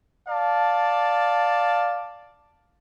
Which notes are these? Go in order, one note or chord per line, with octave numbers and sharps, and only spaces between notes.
D5 F5 A5